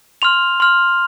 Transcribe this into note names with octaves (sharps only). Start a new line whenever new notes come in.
C6 F6 F7
C6 F6